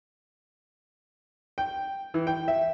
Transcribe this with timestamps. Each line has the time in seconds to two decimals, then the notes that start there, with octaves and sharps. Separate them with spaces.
1.58 G5
2.14 E3
2.27 G5
2.48 E5